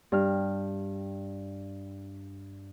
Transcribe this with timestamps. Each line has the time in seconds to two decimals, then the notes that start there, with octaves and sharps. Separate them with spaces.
0.12 G2 F6